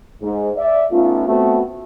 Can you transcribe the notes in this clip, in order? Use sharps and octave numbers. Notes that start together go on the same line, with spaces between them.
G#2
D5 E5
A3 B3 C#4 D#4 F4
A3 B3 C4 F#4